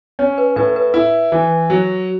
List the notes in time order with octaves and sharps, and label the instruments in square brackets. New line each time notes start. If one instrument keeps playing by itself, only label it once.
[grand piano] C#4 [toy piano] C#5
[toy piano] B4
[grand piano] A2 [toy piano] B4
[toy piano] B4
[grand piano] E4
E3
F#3